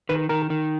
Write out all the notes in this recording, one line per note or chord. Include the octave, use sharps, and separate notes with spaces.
D#3 B4
D#3 A#4
D#3